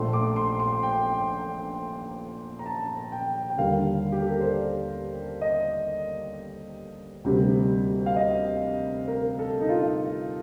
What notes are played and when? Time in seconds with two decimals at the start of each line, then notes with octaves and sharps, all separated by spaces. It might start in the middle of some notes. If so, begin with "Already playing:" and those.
Already playing: A#1 A#2 A3 C6
0.13 D6
0.36 C6
0.60 C6
0.83 G5
2.59 A#5
2.66 A5
3.12 G5
3.50 G5
3.57 D#2 D3 G3 A#3 F5
4.12 G4
4.21 A4
4.31 A#4
4.40 C5
4.49 D5
5.41 D#5
7.24 D2 C3 G3 A#3
8.06 F5
8.16 D#5
9.08 A#4
9.39 A4
9.60 D#4
9.69 F4